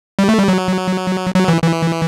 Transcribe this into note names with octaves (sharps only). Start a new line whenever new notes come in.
G3
A3
G3
F#3
F#3
E3
E3